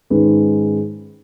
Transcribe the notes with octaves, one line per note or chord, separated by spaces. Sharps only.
G#2 D#3 G#3 C#4 B4